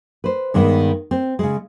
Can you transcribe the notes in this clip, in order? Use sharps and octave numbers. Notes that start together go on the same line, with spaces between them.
B4 C5
G2 D#3 G#3 B3
C4
C#3 G#3